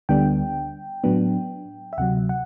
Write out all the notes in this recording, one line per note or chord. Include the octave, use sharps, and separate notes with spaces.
D2 D3 G3 B3 D4 G5
A2 F#3 B3 D4
E5
D2 C3 F#3 F#5
F#5